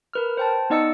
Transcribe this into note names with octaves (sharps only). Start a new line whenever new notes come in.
A#4 B4 F6
C5 G5 A5
B3 D#4 D5 D#5 E6 C#7